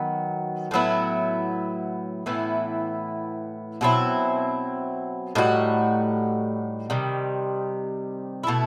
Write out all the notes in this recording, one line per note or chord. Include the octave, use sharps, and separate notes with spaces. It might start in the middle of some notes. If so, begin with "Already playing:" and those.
Already playing: D#3 F#3 B3
A2 F#3 B3 E4
A2 E3 B3 E4
B2 F#3 C4 E4
A2 G3 D#4 F#4
C3 D#3 G3
B2 A3 E4